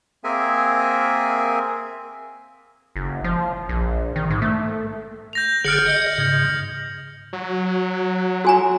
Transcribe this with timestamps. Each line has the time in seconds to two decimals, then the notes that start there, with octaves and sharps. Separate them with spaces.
0.24 A#3 C4 G#4 A#4 E5 G#5
2.96 F#1
3.24 F3
3.69 A#1
4.16 D#3
4.30 G#2
4.42 A3
5.33 G6 A#6 F7
5.64 F#1 D3 G#4 F6 C#7 F#7
5.86 D#5
6.18 G#2 C#3
7.33 F#3
8.45 F#4 G#5 A#5